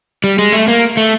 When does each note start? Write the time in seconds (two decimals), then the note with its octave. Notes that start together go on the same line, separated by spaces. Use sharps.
0.24 G3
0.39 G#3
0.52 A3
0.68 A#3
0.97 A3